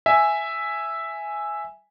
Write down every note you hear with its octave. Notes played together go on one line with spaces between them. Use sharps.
E5 G#5